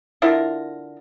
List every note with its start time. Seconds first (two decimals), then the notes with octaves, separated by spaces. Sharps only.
0.22 D3 E4 F4 A#4